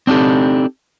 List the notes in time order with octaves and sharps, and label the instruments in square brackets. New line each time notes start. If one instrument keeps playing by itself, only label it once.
[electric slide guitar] C4 D4 D#4 G4 A4